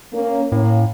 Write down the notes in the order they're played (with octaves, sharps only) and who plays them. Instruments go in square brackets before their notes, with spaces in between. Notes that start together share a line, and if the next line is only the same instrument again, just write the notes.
[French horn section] A#3 C#4
[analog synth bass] A2 [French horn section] A#3 C#4